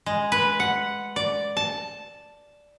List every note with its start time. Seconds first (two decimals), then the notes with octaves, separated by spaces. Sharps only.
0.06 G#3
0.32 B4
0.60 F#5
1.16 D5
1.57 A5